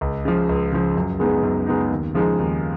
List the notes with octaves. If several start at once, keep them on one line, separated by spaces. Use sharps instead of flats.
C#2
C#3 F3
C#2
C#3 F3
F#2
C#3 G#3 B3 D#4
F#2
C#3 G#3 B3 D#4
D#2
C#3 F3 G#3 D#4
D#2